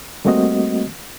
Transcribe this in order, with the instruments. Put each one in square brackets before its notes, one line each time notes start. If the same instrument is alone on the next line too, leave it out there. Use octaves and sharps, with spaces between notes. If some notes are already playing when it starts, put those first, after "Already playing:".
[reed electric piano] G3 A3 A#3 C4 F#4 D#5